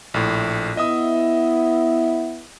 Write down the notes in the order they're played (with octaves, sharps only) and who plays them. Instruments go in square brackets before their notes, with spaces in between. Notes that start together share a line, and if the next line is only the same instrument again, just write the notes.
[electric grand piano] A#1 A2
[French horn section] B3 E4 [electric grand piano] D#5 E5 D#6